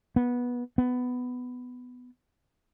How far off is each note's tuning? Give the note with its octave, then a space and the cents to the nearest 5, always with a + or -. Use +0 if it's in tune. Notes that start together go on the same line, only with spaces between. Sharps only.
B3 -15
B3 +10